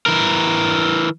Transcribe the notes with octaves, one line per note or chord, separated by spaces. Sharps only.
E3 A#4